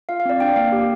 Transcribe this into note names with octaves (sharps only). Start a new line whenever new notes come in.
F4 F5
F5
C4 D5
D4 G5
A#3 F5
G4